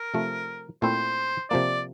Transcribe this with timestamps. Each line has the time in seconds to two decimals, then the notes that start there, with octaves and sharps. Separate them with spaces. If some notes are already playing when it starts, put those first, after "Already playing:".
Already playing: A#4
0.14 C3 F3 A3
0.82 A#2 A3 C4 E4 C5
1.50 C3 F3 A#3 D5